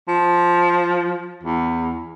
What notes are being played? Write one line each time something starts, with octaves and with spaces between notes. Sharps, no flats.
F3
E2